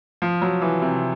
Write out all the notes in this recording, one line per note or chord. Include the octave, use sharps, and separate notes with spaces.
F3
F#3
E3
C3